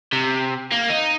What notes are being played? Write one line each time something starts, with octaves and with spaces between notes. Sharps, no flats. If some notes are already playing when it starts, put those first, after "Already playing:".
C3
A#3
D#4